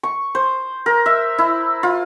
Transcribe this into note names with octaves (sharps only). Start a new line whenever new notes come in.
C#6
C5
A#4
E5
E4
F4